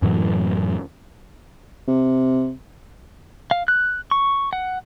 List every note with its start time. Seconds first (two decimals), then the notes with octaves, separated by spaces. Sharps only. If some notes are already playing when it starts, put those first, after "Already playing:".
0.02 F#2 A2 E3 F#3
1.88 C3
3.51 F5
3.68 F#6
4.11 C#6
4.53 F#5